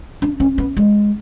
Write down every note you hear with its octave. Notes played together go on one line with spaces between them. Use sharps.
D4
C#4
B3
G#3